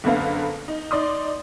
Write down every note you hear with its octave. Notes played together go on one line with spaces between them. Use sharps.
F#1 D3 A#3 B3 A4 F5
D#4
D#4 D5 C6 D#6